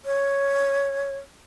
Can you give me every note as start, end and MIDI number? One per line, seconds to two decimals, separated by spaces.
0.05 1.16 73